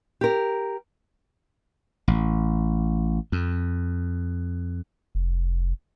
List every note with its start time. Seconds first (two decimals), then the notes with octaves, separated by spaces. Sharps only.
0.21 G4 A#4
2.08 A1
3.32 F2
5.15 F1